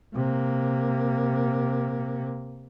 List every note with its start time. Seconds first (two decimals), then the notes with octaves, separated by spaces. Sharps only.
0.16 C3 A#3